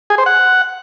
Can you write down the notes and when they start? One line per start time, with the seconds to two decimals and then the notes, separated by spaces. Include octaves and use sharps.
0.10 G#4
0.18 C5
0.26 F#5